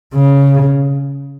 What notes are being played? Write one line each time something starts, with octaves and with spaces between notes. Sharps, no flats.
C#3